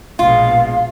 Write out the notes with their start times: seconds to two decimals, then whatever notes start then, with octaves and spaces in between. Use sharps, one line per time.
0.19 A#1 B2 G#3 F4 F5